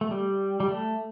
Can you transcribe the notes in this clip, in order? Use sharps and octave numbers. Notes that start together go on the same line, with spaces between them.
A3
G3
G3
A3